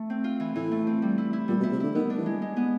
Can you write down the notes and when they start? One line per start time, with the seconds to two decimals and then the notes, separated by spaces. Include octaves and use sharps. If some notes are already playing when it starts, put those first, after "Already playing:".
Already playing: A3
0.10 C4
0.24 F4
0.40 E3
0.56 A2 E3
0.72 A3
0.87 C4
1.02 G3
1.18 E4
1.33 E4
1.48 A#2 G3
1.60 B2
1.63 E4
1.72 C3
1.80 D3 E4
1.95 D#3 B3
2.10 D4
2.18 E3
2.26 G#3
2.42 G#3
2.57 B3